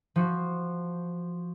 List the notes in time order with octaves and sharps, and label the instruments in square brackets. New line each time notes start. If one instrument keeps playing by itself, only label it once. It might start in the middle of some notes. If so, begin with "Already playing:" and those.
[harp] F3 F#4